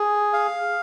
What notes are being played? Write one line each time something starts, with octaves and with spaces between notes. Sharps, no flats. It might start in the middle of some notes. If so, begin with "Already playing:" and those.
Already playing: G#4
F5